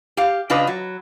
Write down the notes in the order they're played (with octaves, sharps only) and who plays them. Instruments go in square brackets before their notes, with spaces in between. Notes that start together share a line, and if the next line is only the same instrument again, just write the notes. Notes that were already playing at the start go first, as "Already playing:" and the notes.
[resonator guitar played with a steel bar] G4 F5
C#3 D4 F4 B4 D#5
F#3